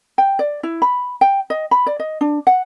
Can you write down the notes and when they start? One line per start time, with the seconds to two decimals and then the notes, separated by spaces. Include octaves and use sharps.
0.18 G5
0.39 D5
0.63 E4
0.82 B5
1.21 G5
1.50 D#5
1.71 B5
1.86 D5
2.00 D#5
2.21 D4
2.47 F#5